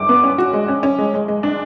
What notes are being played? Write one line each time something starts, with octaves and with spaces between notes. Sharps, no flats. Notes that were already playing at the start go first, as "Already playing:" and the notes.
Already playing: D6
B3
C#4
F#4
G#3
C#4
C#4
G#3
G#3
G#3
D4